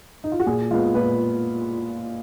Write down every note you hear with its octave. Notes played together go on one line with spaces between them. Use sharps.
D#4
F4
F#4
A#2 G#4
G#3 B3 F4
A#2 B4